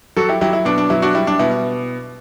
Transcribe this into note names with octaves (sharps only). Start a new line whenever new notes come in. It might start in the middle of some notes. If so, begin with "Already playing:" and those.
F#3 F#4 A4
E4 G4
F#3 E4 G4
E4
B2 D4
D4
F#3 E4
D4 F#4
G3 E4
D4
B2 E4